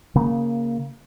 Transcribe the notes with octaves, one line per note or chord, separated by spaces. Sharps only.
C#3 A#3